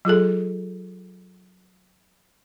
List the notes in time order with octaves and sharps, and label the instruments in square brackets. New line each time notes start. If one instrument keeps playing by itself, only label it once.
[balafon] F#3 F4 G#4 A4